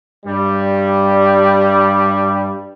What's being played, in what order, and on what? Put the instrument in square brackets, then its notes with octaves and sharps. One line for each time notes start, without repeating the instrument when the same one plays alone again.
[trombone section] G2 G3